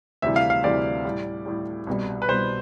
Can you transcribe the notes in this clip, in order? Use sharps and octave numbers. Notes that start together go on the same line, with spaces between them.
D2 C3 E3 G3 E5
F5
F5
D2 C3 E3 G3 D5
A2 G3
A2 G3
C2 B2 G3
B4
C2 B2 G3 C5